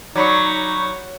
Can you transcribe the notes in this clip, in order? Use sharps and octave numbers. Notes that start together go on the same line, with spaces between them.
F#3 D#4 D5 B5 C#6